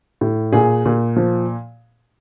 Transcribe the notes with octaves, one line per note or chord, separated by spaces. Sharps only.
A2
A#2 G#4
A#2
F3